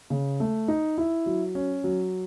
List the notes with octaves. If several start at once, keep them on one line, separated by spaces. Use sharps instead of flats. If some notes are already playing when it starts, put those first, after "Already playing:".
C#3
A3
D#4
E4
F#3
C#4
F#3